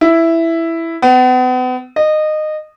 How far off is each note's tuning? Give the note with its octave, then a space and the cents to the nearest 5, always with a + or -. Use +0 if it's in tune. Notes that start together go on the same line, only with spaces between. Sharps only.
E4 +5
B3 +40
D#5 -20